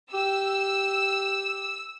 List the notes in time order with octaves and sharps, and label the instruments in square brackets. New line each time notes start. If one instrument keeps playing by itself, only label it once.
[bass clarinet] G4 [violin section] E6